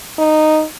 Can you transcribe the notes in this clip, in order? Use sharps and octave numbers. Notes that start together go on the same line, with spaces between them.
D#4